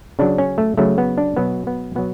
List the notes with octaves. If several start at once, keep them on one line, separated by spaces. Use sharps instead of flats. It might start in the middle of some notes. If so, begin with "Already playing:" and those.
C#3 F#3 D4
C#4
A3
C#3 F#3 A3
B3
D4
B2 F#3 B3
B3
B2 F#3 B3